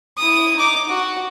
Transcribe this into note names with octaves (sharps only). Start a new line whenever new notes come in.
E4 D#6
D#4 D6
F#4